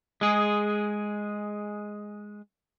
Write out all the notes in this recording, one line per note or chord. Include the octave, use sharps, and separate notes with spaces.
G#3 G#4